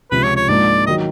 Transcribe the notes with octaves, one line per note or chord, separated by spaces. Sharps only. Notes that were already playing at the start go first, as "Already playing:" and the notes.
C#2 C3 F3 B4
C#5
C#5
G#2 F3 A#3 D4 D5
D#3 F#3 D#5